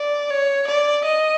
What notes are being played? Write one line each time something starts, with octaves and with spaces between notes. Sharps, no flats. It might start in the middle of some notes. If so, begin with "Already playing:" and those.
Already playing: D5
C#5
D5
D#5